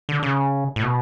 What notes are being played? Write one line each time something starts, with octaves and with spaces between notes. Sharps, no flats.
D3
C#3
A2
B2